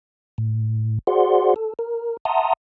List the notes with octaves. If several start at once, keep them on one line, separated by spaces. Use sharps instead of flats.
A2
F#4 G#4 C5 D5 F#5 C6
A4
A#4
E5 F#5 A5 A#5 C6 D#6